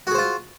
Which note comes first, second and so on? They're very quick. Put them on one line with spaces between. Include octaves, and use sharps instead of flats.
F#4 G#4 C5 F4